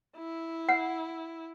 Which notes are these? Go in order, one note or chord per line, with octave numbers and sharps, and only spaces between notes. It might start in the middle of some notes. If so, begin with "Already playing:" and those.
E4
F#5